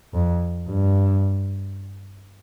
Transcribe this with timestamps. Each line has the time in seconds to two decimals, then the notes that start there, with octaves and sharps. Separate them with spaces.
0.14 F2
0.68 G2